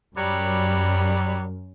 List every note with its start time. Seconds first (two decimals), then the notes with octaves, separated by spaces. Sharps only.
0.17 F#2 F#3 G3